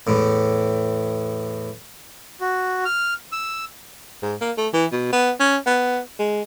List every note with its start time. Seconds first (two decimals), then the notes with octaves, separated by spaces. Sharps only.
0.07 E2 A2
2.41 F#4
2.85 F6
3.32 E6
4.22 G#2
4.41 A#3
4.57 A3
4.73 E3
4.92 B2
5.12 B3
5.40 C#4
5.66 B3
6.19 G#3